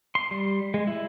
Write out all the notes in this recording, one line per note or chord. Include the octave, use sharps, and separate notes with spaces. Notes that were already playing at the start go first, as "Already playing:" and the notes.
C6
G3
G#3
E4